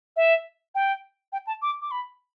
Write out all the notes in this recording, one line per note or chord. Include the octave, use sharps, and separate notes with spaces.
E5
G5
G5
A5
D6
D6
B5